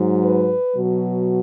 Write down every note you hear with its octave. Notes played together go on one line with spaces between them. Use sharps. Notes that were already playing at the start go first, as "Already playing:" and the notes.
Already playing: G#2 F#3
B4
B2 F#3